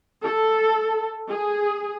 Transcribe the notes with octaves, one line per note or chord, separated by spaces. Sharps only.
A4
G#4